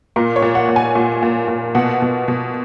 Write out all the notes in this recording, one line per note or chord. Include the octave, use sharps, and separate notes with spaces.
A#2 A#4
C#5
A#2
F#5
A#2
G#5
A#2
A#2
A#2
B2 F#5
B2
B2